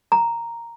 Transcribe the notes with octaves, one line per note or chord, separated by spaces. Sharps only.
A#5